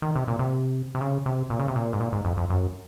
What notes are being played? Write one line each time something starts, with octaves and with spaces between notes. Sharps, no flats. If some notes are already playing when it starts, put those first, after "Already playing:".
D#3
C3
A#2
C3
C3
C#3
C3
A#2
C#3
C3
A#2
G#2
A#2
G#2
F2
F2
F#2